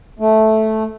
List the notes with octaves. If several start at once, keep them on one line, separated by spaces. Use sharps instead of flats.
A3